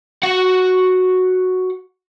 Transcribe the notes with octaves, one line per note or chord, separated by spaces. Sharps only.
F#4 F#5